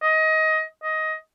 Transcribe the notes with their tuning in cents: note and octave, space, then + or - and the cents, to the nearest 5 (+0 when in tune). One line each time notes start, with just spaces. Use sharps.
D#5 +20
D#5 +15